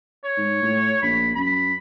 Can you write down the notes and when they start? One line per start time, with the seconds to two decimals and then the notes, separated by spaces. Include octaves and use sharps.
0.24 C#5
0.37 G#2
0.62 A2
1.02 A#1 B5
1.35 F#2 B5